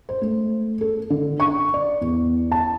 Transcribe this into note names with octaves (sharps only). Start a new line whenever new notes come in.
C5
A3
A4
D3
C#6
D5
E2
A5